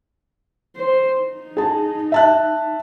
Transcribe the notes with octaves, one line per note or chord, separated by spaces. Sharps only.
C5
D#4
G#4 A5
E5 A5 F#6